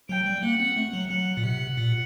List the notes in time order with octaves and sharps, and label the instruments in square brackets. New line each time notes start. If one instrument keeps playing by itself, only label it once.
[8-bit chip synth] F#3 [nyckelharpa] G5
[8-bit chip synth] G3
[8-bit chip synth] A#3 [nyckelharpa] F#5
[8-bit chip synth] C4
A3
F#3
[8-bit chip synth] F#3 [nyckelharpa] F#5
[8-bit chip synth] A#2
[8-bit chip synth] C3 [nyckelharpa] F#5
[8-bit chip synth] A#2